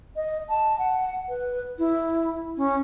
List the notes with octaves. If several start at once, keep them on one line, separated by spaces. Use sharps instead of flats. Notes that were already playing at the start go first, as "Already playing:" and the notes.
D#5
A5
F#5
B4
E4
C#4